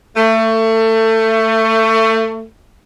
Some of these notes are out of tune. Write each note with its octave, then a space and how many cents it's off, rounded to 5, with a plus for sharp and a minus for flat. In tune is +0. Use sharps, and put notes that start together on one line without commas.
A3 +25